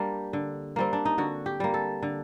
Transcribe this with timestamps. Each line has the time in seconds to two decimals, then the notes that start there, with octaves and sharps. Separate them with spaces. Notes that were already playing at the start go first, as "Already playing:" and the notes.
Already playing: G3 A#3 D4
0.33 D3
0.76 G3 A#3 C4
0.93 D4
1.05 D#4
1.18 D3 F#4
1.46 G4
1.60 G3 A#3
1.74 A4
2.02 D3